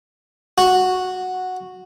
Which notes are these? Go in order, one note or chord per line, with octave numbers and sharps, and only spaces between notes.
F#4